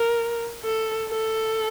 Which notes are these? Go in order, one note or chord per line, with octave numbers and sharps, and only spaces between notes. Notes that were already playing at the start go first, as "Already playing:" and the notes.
Already playing: A#4
A4
A4